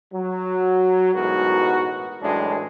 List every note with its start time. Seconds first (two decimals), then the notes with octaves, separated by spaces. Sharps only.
0.14 F#3
1.14 A1 G#2 B2 F#4 A#4
2.23 F#2 A2 E3 G#3 D4